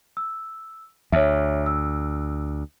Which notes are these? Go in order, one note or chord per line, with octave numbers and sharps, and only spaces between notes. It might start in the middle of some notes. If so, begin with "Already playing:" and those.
E6
D2 C#5 E5
E6